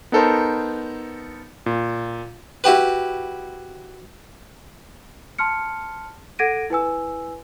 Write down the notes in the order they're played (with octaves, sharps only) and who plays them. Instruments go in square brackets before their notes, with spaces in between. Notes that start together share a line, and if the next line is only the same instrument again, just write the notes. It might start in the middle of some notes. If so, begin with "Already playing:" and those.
[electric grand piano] B3 D#4 A4 A#4 C5
A#2
[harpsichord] E4 F#4 G4 B4
[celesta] A5 C6 F6 C#7
A4 F#5 G#6 A#6 D7 D#7
E4 B4 G#5 E6